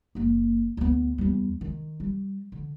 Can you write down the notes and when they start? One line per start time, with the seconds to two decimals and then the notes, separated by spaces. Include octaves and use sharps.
0.15 F#1 A#3
0.77 D2 B3
1.18 E2 G3
1.61 D#3
2.00 G3
2.52 D3